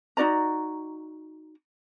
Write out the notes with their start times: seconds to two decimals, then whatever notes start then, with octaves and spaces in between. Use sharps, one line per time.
0.17 D#4 F#4 D5 A#5